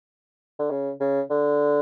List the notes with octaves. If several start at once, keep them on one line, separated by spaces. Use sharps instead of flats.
D3
C#3
C#3
D3